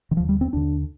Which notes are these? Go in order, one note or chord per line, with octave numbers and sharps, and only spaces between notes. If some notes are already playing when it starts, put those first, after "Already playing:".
D#3
D#2 D3 F3
G3
C4
D#2 D3 D4